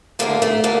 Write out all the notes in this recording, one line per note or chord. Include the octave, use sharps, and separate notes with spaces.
D2 D3 A3 A#3
A3
D3 A3 A#3